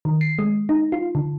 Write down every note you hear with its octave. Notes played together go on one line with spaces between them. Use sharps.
D#3
C7
G#3
D#4
F4
D3